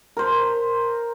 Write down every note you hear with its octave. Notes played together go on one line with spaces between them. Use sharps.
A#4 C5